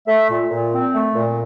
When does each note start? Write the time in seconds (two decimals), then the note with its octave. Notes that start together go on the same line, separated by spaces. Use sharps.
0.07 A3 E5
0.29 A#2
0.50 A#2
0.72 C4
0.93 A3
1.15 A#2